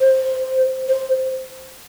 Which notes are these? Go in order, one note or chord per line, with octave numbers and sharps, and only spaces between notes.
C5
C5